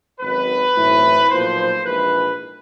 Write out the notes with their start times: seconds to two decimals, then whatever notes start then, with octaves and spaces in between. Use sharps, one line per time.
0.21 G#1 F#2 D#3 F#3 B4
0.75 B1 A2 E3 A3 C4
1.30 B1 A#2 F3 A#3 C5
1.85 A#1 G#2 E3 B4